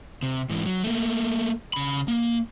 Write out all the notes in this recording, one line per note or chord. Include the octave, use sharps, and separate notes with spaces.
C3
G#2 E3
F#3
A3 A#3
C#3 B5
A#3